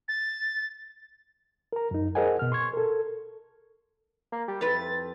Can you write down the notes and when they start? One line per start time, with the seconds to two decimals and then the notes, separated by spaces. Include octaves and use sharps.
0.08 A6
1.73 A#4 A#5
1.91 F#2 D#4
2.15 G#4 A#4 C5 D#5 F#5 G#5
2.39 B2 F6
2.52 C6 C#6 G#6
2.73 A4 A#4
4.32 A#3
4.48 G3
4.61 F2 E4 B4 A6